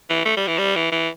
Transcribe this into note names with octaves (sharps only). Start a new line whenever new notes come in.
E3
A3
G3
E3
G3
E3
E3